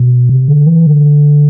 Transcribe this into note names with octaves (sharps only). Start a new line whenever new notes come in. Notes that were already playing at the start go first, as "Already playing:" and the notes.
Already playing: B2
C3
D3
E3
D3